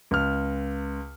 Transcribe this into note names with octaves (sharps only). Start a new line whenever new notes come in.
C#2 F6